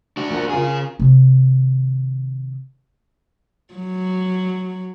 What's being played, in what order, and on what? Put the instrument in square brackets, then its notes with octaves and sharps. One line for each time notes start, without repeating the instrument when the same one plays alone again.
[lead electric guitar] D4 F#4
[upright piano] D#1 A#3 F#5
[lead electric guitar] C#3 G#4 [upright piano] F4 A#4
[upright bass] C3 D#3
[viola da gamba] F#3